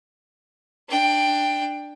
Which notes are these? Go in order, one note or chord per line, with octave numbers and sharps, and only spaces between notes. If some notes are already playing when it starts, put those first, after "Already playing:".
D4 G5